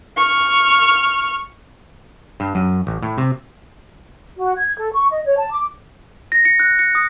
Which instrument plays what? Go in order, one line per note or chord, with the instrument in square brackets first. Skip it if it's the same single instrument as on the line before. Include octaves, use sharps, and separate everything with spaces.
[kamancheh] C#6 F6
[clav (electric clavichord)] G2
F#2
A1
A2
C3
[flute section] F#4
G#6
A4
C#6
D#5
C#5
A5
D6
[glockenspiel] A#6
C#7
F#6
C#7
D#6